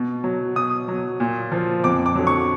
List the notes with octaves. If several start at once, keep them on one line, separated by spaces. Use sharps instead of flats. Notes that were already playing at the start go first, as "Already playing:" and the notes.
Already playing: B2
F#3
B2 D#6
F#3
A#2
F3
F2 D6
D6
D3 F#3
C#6